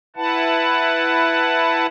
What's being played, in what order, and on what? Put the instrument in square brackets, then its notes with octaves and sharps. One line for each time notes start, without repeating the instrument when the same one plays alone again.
[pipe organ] E4 B4 F#5 A5